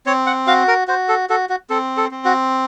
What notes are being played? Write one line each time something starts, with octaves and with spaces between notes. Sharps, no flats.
C4 C#5
F#5
F#4 F5
A#4
F#4 C5
A4
F#4 A4
F#4
C4 A4
A4
C4
F#4